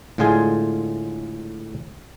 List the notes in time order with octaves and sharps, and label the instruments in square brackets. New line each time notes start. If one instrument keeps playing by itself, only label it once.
[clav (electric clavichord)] A2 D3 G#3 F4 G#4 G#5